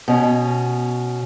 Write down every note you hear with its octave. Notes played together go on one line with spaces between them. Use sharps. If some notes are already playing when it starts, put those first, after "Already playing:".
B2 C#4